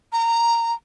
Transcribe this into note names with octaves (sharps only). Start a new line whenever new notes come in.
A#5